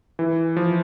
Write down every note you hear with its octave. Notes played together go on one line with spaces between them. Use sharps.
E3
F3